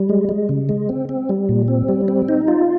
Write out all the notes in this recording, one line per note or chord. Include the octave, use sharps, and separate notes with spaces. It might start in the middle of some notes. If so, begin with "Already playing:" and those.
Already playing: G3
G#3
G#3
C#3
G#3
C4
C4
G3
A#2
C4
G3
C4
D#4
F4